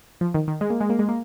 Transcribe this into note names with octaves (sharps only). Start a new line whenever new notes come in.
F3
D#3
D#3
G#3
A#3
G#3
A#3
G#3
A#3